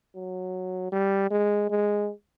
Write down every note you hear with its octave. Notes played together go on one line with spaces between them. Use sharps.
F#3
G3
G#3
G#3